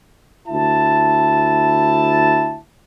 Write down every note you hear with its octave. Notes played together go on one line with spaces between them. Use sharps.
D2 E4 A5